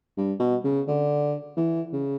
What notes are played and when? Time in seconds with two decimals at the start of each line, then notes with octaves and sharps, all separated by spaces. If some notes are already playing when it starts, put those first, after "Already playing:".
0.17 G2
0.40 B2
0.64 C#3
0.88 D3
1.57 E3
1.93 C#3